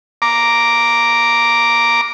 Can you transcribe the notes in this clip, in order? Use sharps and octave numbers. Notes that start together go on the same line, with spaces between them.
A#5 D6